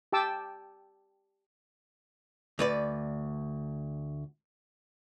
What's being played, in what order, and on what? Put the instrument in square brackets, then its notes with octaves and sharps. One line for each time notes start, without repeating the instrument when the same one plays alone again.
[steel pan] G4 G5 A5 D6 E6
[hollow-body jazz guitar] D2 B4 D5